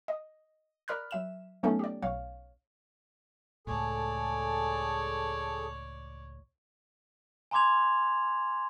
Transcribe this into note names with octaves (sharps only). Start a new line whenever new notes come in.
D#5
A#4 D5 B5 F6 F#6
F#3 E5 E7
F#3 A3 B3 C#4 D#4 A4
G4 D5
B1 C#5 F5
C#2 A2 G#4 A4 C#5 D5
G#5 A#5 C6 D6 G#6 F7